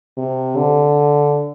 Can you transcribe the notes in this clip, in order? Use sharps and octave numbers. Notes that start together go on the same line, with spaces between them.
C3
D3